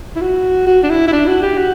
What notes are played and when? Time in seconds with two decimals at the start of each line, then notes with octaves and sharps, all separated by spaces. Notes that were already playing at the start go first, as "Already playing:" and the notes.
0.16 E4
0.21 F#4
0.67 F#4
0.83 D4
0.90 E4
1.08 E4
1.13 D4
1.27 F#4
1.42 G4
1.58 F#4